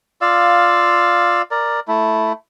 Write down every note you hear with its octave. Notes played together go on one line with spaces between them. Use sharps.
F4 D5 F5 E6
A#4 D5
A3 E4